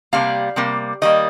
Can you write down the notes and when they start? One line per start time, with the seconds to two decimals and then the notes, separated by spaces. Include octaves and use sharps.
0.13 C3 G3 A#3 F5
0.56 C3 G3 A#3
1.02 D#3 G3 A#3 D#5